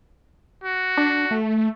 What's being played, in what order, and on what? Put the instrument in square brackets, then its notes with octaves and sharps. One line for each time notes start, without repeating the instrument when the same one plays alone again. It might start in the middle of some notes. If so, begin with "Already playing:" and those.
[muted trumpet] F#4
[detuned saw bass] D4
A3